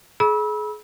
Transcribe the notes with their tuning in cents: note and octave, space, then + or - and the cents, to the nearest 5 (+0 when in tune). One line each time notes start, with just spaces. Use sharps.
G#4 +35 B5 -30 E6 -25